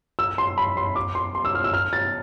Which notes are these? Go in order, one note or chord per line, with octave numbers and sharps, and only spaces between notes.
E6
C6
B5
C6
D6
C6
C6
E6
F6
E6
F6
A6